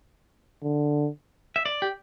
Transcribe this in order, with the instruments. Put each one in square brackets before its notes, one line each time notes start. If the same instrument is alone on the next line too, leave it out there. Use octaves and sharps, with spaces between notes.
[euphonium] D3
[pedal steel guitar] E5
D5
G4